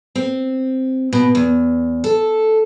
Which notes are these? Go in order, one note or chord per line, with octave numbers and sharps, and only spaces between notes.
C4
B2
E2
A4